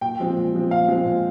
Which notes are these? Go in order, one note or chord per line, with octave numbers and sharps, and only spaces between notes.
A#2 G5
F3 G#3 C4
A#2
F3 G#3 C4
A#2 F5
F3 G#3 C4
A#2